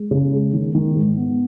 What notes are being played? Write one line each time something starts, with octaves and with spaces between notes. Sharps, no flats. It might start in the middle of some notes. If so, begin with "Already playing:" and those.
Already playing: G#3
C#3
G#3
D#3
D#3
G#2
B3